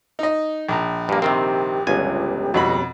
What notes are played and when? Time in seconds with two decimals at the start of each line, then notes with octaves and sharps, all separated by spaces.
0.19 D#4 D#5
0.68 A#1 G5 A5 A#5
1.09 G2 A#3 G4
1.22 C3 D#3 C4 A#4 G5
1.87 G1 C#2 G4 G#5
2.54 F2 B2 F#4 D#5 B5